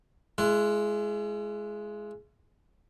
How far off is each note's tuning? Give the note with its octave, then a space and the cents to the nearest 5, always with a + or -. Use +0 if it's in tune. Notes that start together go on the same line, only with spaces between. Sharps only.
G#3 +15 E4 +45